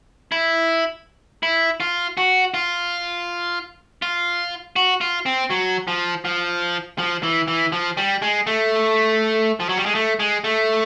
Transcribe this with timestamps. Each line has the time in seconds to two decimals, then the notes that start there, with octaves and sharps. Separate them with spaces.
0.32 E4
1.43 E4
1.80 F4
2.17 F#4
2.54 F4
4.02 F4
4.76 F#4
5.01 F4
5.26 C4
5.50 F#3
5.88 F3
6.25 F3
6.98 F3
7.23 E3
7.48 E3
7.72 F3
7.97 G3
8.22 G#3
8.47 A3
9.60 F3
9.69 F#3
9.77 G3
9.86 G#3
9.95 A3
10.19 G#3
10.44 A3